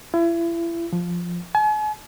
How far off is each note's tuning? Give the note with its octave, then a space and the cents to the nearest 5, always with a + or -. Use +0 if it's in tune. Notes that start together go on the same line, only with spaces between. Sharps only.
E4 +35
F3 +0
G#5 +40